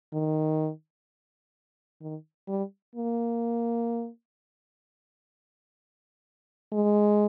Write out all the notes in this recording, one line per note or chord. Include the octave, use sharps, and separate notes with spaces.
D#3
D#3
G3
A#3
G#3